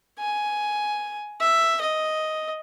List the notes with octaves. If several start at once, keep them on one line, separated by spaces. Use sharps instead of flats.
G#5
E5
D#5